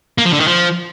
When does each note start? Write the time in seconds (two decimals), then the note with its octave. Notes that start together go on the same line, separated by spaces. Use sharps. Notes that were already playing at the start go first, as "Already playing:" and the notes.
0.18 A#3
0.25 F3
0.33 D3
0.40 D#3
0.48 F3